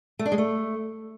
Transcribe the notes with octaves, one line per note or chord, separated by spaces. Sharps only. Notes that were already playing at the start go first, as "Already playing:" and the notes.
A3
D4
G#3
A3